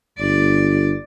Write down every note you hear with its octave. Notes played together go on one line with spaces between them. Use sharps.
G1 D5